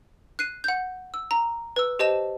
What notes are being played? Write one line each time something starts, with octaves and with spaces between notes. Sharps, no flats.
F#6 C7 D#7
F#5 G6
E6
A#5
B4 E6
G4 C5 D#5 A5 E7